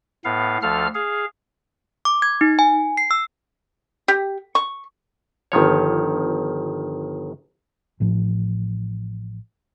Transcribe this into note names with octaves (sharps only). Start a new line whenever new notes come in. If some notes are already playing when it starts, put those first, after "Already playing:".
A2 B3 F5
D2 F3 A4 F5 F6
G#4 F5
D6
G#6
D#4
G#5
C7
E6
G4
C#6
G1 D#3 F3 C#5
A1 A2 F3